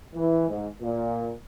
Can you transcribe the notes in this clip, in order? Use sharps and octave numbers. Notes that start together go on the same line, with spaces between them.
E3
G#2
A#2